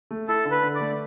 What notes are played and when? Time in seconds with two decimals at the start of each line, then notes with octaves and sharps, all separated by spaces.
0.11 A3
0.28 E4 A4
0.45 D3
0.51 B4
0.63 D3
0.75 D5
0.80 A3